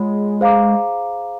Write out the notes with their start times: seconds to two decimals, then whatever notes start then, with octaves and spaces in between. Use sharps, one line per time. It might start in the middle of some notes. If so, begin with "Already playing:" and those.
Already playing: G#3 F4 G#4 C#5 F#5 B5
0.41 G#4 C5 F5 A#5 D6